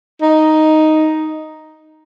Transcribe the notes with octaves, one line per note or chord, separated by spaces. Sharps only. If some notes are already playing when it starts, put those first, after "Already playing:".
D#4